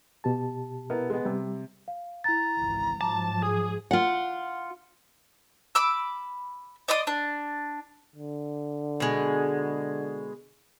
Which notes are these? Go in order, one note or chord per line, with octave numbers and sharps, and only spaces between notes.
B2 G4 A5
B3 E4 A#4
G#3 B3
C3 G3
F5
E4 A#5 A6
G#1 C#2 E3
G#2 F3 F#3 A5 D6
G#4 D#6
F4 F#5
B5 D6 E6
D5 D#5 C6 D#6
D4
D3
B2 G#3